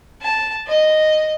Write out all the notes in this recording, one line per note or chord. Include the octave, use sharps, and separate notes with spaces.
A5
D#5